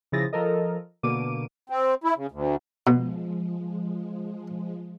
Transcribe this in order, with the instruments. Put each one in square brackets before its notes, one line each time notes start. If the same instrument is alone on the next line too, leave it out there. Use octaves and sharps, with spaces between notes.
[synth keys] C#3 F3 E4 G#4 A6 A#6
F3 A4 A#4 D#5
B2 D3 A#3 D6 D7 D#7
[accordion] C4
E4
C#3
D2
[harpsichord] B2 [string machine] F3 G#3